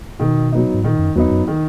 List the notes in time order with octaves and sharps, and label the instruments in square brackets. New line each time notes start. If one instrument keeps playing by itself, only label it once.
[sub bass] B2 [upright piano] D#3
[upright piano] F#3 B3 D#4
[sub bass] G#2
[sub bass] A#2 [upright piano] D#3
[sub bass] F#2
[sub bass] E2 [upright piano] F#3 B3 D#4
[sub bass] F#2
[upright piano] D#3